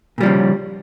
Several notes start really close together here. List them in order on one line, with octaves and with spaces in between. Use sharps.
A#2 G3 F3 C#3